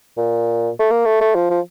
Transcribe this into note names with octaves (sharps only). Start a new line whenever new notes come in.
A#2
A3
A#3
A3
A3
F3
F3